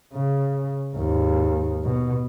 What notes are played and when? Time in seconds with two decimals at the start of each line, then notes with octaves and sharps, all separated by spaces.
0.13 C#3
0.95 D#2 G#2
1.84 B2